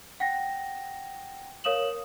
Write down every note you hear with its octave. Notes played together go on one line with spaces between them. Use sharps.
F#5 G5 A#6
A#4 C#5 F5 D#6 E7 F#7